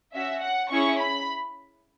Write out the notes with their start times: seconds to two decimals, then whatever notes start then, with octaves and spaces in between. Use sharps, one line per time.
0.14 C#4 F#4 E5
0.43 F#5
0.71 C#4 E4 G#4 C#6
1.00 B5